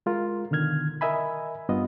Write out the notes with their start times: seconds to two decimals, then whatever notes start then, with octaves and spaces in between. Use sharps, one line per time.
0.06 G#3 F4 A#4
0.51 B2 D3 D#3 F6 G#6
1.01 A#4 D#5 E5 G#5 B5
1.69 G2 B3 F4 D#5